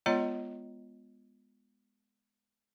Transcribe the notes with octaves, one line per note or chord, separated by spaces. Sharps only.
G#3 B3 F4 C#5 D#5 A#5